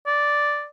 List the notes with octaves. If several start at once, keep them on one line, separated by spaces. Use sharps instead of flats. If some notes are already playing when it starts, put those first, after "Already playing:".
D5